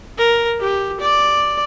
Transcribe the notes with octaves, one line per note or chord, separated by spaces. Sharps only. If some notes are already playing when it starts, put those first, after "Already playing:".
A#4
G4
D5 D6